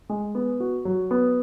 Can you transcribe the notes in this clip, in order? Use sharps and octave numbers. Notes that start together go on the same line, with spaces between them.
G#3
B3
F#4
F#3
B3